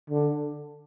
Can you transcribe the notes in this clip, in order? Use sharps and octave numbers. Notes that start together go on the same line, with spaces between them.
D3